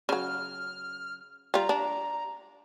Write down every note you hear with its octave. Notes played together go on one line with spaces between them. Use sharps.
C#3 F#3 F6
G3 F4 A#5
D4